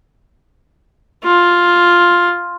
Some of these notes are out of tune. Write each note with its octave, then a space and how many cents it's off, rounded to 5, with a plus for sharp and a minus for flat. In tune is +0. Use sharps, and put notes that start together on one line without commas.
F4 +5